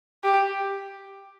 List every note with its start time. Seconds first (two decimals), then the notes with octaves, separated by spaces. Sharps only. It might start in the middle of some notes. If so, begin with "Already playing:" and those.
0.24 G4